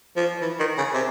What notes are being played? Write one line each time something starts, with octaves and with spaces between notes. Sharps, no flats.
F3
E3
D#3
C#3
C3